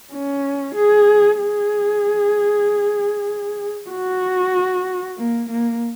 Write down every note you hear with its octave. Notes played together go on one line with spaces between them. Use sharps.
C#4
G#4
G#4
F#4
A#3
A#3